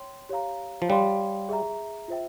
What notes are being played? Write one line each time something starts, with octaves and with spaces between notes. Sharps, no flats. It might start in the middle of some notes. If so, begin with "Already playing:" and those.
Already playing: C#5 G5 C6
G4 C#5 F5 A#5
F3
G3 C#5 F5 C6
G#4 E5 A#5
F4 C5 E5 G5